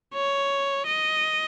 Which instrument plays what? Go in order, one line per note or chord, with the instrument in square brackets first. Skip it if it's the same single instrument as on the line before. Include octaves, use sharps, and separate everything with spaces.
[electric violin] C#5
D#5